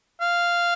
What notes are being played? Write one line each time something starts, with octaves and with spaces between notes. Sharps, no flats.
F5